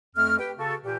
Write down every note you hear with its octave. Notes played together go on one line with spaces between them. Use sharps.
F2 A3 F6
G4 B4 G5
C#3 F#4 A4
A#2 E3 G4